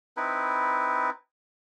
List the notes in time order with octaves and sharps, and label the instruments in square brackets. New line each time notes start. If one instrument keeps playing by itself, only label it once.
[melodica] C4 D#4 E4 B4